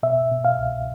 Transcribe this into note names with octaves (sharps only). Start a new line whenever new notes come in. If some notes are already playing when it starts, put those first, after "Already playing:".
B2 E5
B2
F5
C2